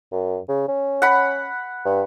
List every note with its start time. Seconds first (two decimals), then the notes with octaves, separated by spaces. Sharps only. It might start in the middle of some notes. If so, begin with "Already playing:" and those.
0.12 F#2
0.49 C#3
0.68 C#4
1.02 F#5 B5
1.85 G2